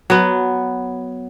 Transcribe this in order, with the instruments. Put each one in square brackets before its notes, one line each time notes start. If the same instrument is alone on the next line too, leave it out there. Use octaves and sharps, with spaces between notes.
[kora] F#3 B3